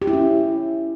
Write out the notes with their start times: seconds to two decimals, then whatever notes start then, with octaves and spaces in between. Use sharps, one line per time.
0.02 G4
0.07 E4
0.13 C#4